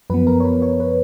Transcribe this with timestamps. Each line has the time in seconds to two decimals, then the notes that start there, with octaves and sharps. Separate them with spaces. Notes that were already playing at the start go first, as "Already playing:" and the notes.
0.10 F#2 F3 B3 B4
0.27 A#4
0.40 C#5
0.45 B4
0.62 C#5
0.80 B4